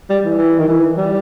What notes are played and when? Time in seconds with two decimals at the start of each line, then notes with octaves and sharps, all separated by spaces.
0.10 G3
0.25 E3
0.38 E3
0.59 D#3
0.68 E3
0.97 G3